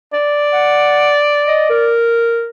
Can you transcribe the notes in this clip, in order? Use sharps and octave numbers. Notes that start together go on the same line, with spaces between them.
D5
F#5
D#5
A#4